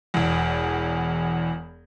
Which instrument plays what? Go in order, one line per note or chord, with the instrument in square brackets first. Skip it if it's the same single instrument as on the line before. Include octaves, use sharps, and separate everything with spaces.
[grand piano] E1 E2